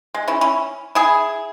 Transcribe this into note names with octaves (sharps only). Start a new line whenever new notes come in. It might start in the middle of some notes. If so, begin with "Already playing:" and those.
G#3
C#4 E4
C#4 E4
E4 G#4